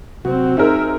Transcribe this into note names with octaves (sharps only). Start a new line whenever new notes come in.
C3 F#3 C4 F#4
D#4 G#4 A#4 E5